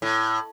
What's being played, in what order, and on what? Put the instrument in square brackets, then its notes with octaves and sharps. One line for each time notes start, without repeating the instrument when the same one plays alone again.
[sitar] A2